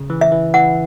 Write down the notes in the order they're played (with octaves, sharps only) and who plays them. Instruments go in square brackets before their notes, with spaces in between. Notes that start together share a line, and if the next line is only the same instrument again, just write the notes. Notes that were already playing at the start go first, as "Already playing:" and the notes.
Already playing: [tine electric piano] C#3
E3
[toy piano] E5
[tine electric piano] E3
[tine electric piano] E3 [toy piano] F#5